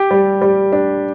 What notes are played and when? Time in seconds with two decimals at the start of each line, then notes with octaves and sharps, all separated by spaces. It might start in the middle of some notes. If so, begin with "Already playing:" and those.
Already playing: G4
0.11 G3
0.42 G3
0.73 D4